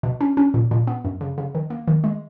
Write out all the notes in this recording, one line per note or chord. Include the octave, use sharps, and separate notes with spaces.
B2
C#4
C#4
A#2
A#2
B3
F#2
C#3
C#3
D#3
A#3
D#3
G#3